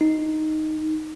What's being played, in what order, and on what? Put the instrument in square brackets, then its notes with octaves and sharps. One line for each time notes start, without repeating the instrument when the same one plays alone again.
[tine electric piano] D#4